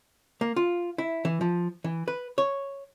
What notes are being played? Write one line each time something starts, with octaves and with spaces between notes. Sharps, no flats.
A#3
F4
E4
E3
F3
E3
B4
C#5